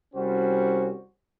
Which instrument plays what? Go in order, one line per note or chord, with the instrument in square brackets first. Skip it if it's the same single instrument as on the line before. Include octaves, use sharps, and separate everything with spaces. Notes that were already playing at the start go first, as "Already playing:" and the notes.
[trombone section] C2 G3 C#4 F#4 C5